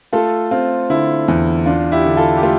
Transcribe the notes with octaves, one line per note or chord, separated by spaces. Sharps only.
A3 F4 A4
C4 F4
D3 E4
E2
D4 F4
E4 G4
D3
F4 A4
G4
A3 F4